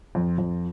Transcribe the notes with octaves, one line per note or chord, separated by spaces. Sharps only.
F2
F2